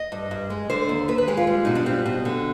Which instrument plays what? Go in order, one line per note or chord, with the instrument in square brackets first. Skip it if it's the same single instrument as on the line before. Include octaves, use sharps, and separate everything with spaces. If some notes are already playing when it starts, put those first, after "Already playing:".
Already playing: [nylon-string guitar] D#5
G2
G2
G#3
D3 C5
D#2
D#2 B4
B4
G#3 G4
F4
G3
B2 D#4
D4
G3 C4
B2
D3